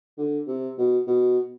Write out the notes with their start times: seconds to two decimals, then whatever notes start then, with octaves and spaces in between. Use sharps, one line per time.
0.18 D3
0.47 C3
0.78 B2
1.07 B2